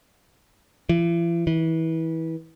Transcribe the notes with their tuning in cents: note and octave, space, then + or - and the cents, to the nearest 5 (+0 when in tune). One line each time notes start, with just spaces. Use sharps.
E3 +45
E3 -25